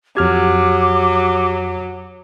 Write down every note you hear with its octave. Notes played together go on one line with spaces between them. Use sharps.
F2 F#3 G4 D6 F6 G#6